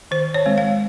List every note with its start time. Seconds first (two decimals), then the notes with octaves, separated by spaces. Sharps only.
0.11 D#3 C5
0.34 C#5
0.46 G#3 C4
0.58 F5